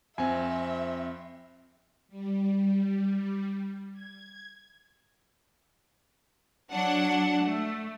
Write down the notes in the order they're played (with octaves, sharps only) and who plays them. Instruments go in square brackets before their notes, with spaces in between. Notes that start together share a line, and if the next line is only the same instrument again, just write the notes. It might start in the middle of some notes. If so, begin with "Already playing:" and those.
[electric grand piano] F2 C4 [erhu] E5 [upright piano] G#5
[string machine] G3
G#6
[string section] F#3 D4 F#5
A3